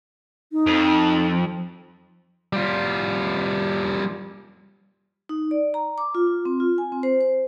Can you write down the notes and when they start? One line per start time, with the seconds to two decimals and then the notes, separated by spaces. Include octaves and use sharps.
0.52 D#4
0.66 F2
2.53 G3 F4
5.29 D#4
5.51 D5
5.74 A#5
5.98 D6
6.15 F4
6.27 F4
6.45 C4
6.60 F4
6.78 G#5
6.92 C4
7.03 C5
7.21 C5